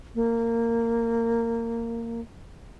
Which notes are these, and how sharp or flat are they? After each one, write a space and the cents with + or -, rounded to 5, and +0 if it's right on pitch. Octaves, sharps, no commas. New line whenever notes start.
A#3 -15